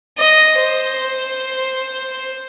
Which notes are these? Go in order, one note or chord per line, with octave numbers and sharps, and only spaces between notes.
D#5
C5